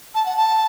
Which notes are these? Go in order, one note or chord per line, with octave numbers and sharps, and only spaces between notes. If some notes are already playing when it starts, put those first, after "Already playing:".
A5
F#5
A5